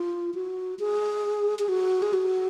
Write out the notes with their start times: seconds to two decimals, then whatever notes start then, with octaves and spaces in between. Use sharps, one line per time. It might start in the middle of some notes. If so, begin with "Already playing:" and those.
Already playing: F4
0.34 F#4
0.79 G#4
1.59 G#4
1.69 F#4
2.02 G#4
2.13 F#4